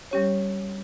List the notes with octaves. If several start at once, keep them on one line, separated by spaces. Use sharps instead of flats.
G3 C#4 G4 C#5